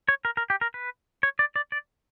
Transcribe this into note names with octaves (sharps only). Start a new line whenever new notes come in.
C#5
A#4
A#4
G4
A#4
B4
C#5
D5
D5
D5